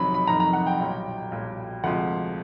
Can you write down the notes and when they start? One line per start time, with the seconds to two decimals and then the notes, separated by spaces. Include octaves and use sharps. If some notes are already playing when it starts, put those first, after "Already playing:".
Already playing: F2 C3 D#3 F#3 B5
0.14 B5
0.27 F2 C3 D#3 F#3 A#5
0.40 A#5
0.53 F#5
0.67 G5
0.79 B1 A#2 G3
1.32 B1 A#2 G3
1.84 D2 C3 F3 G#3 F#5